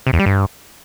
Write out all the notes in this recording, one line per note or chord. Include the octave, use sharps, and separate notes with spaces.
C3
E2
G3
G2